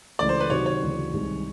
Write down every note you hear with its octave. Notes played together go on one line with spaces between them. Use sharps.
C#2 C#3 E3 A3 D5
C5
B4
C3 D#3 F#3 C#5
C#5
D2 C#3 E3
C2 C3 D#3 G#3